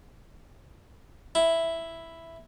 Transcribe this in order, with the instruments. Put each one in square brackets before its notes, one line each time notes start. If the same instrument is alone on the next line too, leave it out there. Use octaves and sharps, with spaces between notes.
[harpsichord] E4